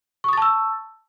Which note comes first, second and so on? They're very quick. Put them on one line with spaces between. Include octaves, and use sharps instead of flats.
C#6 D#6 A6 A5 E6